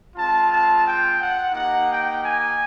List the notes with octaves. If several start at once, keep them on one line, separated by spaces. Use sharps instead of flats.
G#3 C4 F4 A5
A5
G5
F#5
A#3 D#4 G4 F#5
G5
G#5